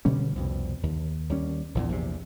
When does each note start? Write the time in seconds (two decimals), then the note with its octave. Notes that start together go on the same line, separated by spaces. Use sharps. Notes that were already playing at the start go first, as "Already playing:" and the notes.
0.05 B2 D3 G3 C#4
0.36 C2 F2 B2
0.83 D#2
1.29 D#2 G3 C#4
1.75 A#1 E2 A#2
1.89 A#1 E2 C3